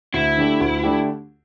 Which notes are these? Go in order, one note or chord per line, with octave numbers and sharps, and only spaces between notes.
D2 E4
D3 A3 D4 G4
D2
D3 A3 D4 G4